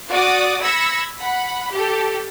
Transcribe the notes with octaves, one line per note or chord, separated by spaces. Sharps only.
F#4 D5 D6 D#6
B5 E6 G#6 A#6 C#7
F#5 B5
G4 A4